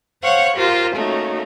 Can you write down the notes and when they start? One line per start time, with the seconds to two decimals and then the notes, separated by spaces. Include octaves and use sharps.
0.23 C5 C#5 F5 F#5 C#6
0.56 F4 G4 A#4 C5
0.94 A3 A#3 C#4 D#4 F#4